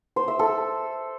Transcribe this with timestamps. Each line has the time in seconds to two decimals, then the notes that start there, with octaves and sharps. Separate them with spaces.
0.16 C5
0.28 E5
0.39 A4